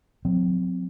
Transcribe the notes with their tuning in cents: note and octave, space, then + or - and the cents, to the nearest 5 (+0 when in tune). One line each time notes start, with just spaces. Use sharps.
F#3 -45 C4 -20